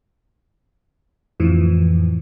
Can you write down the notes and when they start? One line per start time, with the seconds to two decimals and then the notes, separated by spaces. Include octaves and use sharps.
1.40 F2 A2 E3 F3